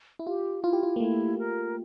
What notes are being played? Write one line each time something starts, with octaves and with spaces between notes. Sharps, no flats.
E4
F4 G4
E4 F4
G4
F4
A#3
A3 E4
A#4